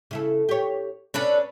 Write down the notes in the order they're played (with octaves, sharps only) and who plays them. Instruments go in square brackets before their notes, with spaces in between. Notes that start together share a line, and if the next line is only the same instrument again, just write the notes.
[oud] C#3 E4 A4
G4 C#5
[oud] C#4 [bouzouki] D4 A4 B4